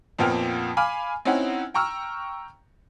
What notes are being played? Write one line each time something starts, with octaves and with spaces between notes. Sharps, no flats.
F2 A#2 F3 B3 G5 F6
F5 G#5 B5 D6 F6
C4 C#4 D#4 E4 F#5
G5 A#5 C#6 E6 F6